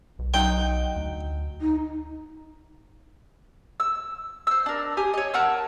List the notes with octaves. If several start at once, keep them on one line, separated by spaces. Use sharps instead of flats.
B1
F#3 D#4 G5
D2
D#4
E6
C5 E6
D4 A#4
G4 G#5 D#6
C#5 D#5
A#4 F#5 A5 E6